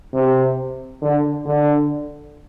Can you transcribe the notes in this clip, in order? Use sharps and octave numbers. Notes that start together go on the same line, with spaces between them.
C3
D3
D3